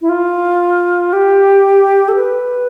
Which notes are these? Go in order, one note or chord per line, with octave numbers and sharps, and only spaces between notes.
E4
F4
G4
A4
B4